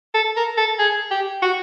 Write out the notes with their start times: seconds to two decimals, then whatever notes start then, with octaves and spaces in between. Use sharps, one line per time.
0.14 A4
0.37 A#4
0.57 A4
0.79 G#4
1.11 G4
1.42 F#4